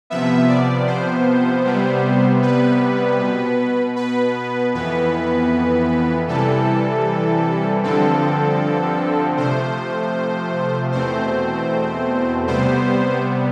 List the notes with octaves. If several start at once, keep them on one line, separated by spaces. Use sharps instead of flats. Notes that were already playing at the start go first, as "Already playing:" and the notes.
C3 F3 B3 E5
D5
C5
C3 G3 B3
B4
B2 B3
B4
F2 E3 B3 B4
C3 E3 G3 A4
G2 D3 F3 C4 A4
C3 F3 A3 C5
E2 B2 A3 C4 C5
C3 G3 B3 C5